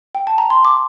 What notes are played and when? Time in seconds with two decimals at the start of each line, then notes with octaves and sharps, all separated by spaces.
0.15 G5
0.27 A5
0.38 A#5
0.50 C6
0.65 D6